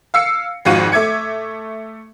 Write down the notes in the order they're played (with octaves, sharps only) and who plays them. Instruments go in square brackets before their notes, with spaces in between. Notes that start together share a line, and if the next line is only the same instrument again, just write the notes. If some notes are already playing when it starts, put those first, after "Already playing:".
[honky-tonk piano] F5 E6 C7 C#7
G#1 F2 G#2 F#4 F5 D#7
A3 E5 D6 G#6 C#7